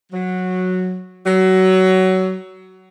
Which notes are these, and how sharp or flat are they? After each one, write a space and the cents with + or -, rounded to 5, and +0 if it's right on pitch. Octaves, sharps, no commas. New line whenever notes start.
F#3 -10
F#3 +20